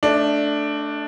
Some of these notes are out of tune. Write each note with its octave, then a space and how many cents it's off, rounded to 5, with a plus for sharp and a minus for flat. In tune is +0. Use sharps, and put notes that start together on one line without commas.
A3 +0 D4 +0 D#5 -40